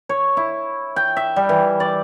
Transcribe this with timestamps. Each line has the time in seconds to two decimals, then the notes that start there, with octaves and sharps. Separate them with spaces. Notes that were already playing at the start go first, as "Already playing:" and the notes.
0.09 C#5
0.37 E4
0.96 G5
1.17 E5
1.36 G3
1.49 E3
1.80 D5